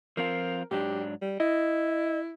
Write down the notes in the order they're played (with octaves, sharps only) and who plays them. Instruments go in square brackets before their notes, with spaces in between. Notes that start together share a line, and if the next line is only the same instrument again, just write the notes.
[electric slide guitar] F3 C4 F4 [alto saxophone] A#4
[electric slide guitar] G#2 F#3 D4 [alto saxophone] G4
[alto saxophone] G3
[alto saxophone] E4 [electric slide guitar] D#5